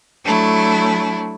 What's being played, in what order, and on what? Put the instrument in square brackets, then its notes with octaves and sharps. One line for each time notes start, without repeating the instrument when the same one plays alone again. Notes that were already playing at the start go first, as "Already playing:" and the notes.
[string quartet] F#3 A3 D4 E4